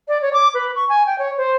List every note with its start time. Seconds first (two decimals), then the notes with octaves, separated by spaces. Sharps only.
0.08 D5
0.22 C#5
0.33 D6
0.54 B4
0.76 C#6
0.89 G#5
1.06 G5
1.19 C#5
1.37 C5